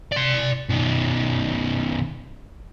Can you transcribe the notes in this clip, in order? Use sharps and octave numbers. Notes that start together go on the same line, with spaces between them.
D5 C6
B2 D#3